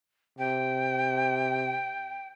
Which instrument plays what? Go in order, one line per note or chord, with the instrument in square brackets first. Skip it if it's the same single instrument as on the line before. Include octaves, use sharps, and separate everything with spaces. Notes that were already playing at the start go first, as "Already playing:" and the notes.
[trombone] C3 [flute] G5